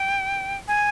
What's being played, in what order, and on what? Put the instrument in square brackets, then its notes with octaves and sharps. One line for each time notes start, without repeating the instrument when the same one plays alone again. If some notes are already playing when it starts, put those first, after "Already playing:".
Already playing: [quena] G5
G#5